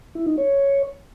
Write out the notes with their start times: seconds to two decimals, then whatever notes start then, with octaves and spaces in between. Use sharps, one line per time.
0.15 E4
0.26 D#4
0.38 C#5